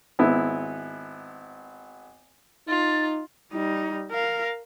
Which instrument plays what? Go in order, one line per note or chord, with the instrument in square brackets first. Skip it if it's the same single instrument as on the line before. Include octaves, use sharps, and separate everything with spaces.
[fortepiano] G#1 B3 E4
[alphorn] D#4 [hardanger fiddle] F4 [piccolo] A6
[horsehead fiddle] G3 D#4
A#4 F5